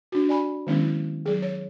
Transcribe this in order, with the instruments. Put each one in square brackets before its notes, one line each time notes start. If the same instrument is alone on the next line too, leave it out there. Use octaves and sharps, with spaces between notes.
[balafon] D4 F#4
D5 G#5 B5
D#3 F#3 G#3 B3 C#4 E4
F#3 G#4
C#5